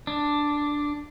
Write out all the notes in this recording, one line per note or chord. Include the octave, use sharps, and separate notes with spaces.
D4